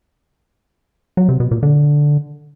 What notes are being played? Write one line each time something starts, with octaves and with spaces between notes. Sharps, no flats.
F#3
C3
B2
A#2
D3